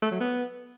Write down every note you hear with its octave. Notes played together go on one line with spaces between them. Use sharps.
A3
F#3
B3